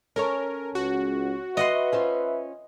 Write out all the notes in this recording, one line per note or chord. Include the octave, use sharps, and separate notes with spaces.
C#4 A4 A#4 C#5
C#2 F#4
B4 D#5 E5 F#5 C6
C#4 F4 C5